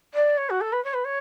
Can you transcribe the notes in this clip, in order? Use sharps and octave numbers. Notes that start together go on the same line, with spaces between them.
D5
C#5
F#4
A4
B4
C#5
B4
C#5